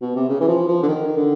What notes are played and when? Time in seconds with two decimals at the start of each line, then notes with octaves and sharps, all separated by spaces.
0.02 B2
0.16 C3
0.29 C#3
0.40 E3
0.48 F3
0.68 F3
0.83 D3
0.88 D#3
1.16 D3